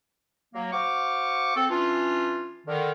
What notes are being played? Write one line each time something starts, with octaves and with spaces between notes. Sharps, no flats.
F#3 A#3
F#4 C5 F5 C#6 D6
C4 A4
E3 C#4 D4 F4
D3 D#3